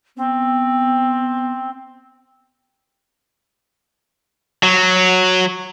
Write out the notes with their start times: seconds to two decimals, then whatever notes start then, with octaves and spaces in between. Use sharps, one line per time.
0.17 B3 C4
4.63 F#3